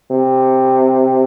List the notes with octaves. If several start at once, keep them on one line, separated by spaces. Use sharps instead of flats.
C3